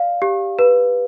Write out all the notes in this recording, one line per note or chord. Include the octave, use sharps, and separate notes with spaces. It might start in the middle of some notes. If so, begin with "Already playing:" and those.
Already playing: D5 F5
G4
B4